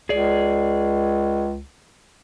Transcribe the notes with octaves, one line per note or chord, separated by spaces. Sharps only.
C#2 G#4 D5